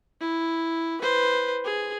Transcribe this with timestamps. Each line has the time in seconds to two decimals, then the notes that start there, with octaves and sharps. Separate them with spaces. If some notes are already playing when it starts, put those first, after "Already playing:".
0.21 E4
1.01 B4 C5
1.65 G#4